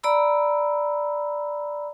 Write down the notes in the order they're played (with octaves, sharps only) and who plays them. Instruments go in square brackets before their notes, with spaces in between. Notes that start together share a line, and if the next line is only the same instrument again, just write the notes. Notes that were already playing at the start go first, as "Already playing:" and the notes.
[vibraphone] D5 A#5 B5 E6